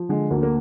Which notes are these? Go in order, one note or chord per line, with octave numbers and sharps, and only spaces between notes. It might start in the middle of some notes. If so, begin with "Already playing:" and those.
Already playing: F3
D3 G#3
D2 A#3
A#3